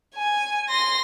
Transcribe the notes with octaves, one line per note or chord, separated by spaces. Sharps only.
G#5
C6 A#6